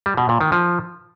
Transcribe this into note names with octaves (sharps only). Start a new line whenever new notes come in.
G3
B2
A#2
D#3
F3